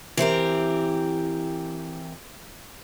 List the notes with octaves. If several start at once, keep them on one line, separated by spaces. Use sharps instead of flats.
E3 C4 G4 A#4